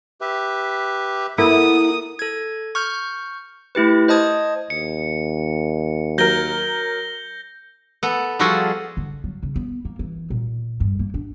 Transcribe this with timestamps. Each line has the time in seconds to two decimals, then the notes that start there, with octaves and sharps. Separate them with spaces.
0.21 G4 B4 E5
1.38 A#3 B3 E4 A4 A#4 D#6
2.19 A4 G#6
2.75 C#6 F6 G6
3.75 A3 E4 G4 B4
4.08 C5 D#5 A5 D#6 G#6
4.70 D#2 C#7
6.18 F#3 A#4 G6 A#6 G7
8.03 B3 A4
8.39 F3 G3 F4 F#4 G#4 A4
8.97 D3
9.24 F#3
9.43 C#3
9.56 B3
9.85 A#3
9.99 E3
10.30 A#2
10.80 G2
10.99 A#3
11.14 D4